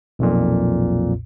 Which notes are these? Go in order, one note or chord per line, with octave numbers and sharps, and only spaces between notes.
B1 F2 A#2